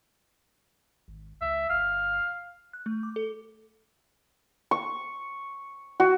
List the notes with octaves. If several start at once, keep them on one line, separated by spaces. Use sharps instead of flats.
G#1
C#2 E5
G1 F5
F#6
A3
D6
A4
C#6
F#4